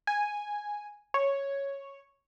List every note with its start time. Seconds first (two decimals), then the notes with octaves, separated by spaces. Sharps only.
0.07 G#5
1.14 C#5